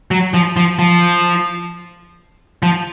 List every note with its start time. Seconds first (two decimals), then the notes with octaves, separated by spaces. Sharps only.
0.11 F#3
0.34 F3
0.57 F3
0.79 F3
2.63 F3